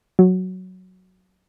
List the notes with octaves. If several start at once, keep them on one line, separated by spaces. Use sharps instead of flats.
F#3